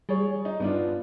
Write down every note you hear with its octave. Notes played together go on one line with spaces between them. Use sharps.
G3 G#4 C#5
D#4
G2 B3 D4 F4